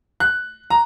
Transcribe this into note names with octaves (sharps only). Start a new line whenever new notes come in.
F#6
A#5